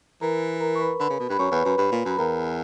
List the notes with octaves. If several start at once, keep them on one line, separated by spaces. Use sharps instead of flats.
E3 A#4 A#5
A#4 A#5
C#6
B4 B5
D3 B4 B5
C#3
B2
G2 B5
F#2 C#5 C#6
E2 B4 B5
F#2 B4 B5
G2 B4 B5
A#2
F#2
B5
E2 A#4 A#5